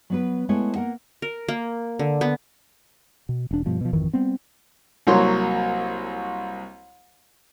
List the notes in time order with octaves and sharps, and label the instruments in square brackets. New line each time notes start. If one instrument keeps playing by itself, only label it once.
[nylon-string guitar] F#3 B3 B4
G#3 A3 B3 E4 C#5
A#3 A#4 F#5
[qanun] A#4
A#3
D3
B3
[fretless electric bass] B2
E1 D4
G2 B2 F3
B2 F3
G#1 F2 D#3 E3
G3 B3 C4
[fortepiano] C2 F#3 A#3 C#5 C6